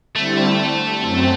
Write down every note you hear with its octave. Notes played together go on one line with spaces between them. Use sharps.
D3 G3 A3 C4 E4
F#2 F#3 C4